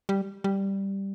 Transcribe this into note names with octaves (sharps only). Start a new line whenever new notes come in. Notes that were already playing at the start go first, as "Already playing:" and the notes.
G3
G3